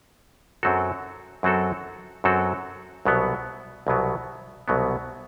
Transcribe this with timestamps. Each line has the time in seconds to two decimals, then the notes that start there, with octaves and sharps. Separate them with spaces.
0.63 F#2 F#3 C4 F#4 A4
1.43 F#2 F#3 C4 F#4 A4
2.24 F#2 F#3 C4 F#4 A4
3.05 C2 B2 F#3 B3
3.87 C2 B2 F#3 B3
4.68 C2 B2 F#3 B3